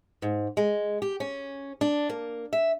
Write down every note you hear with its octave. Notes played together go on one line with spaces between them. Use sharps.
G#2
G#3
G4
C#4
D4
A#3
E5